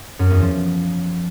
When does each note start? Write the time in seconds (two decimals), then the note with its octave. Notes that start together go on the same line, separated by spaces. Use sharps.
0.19 F#2
0.30 E2
0.42 F3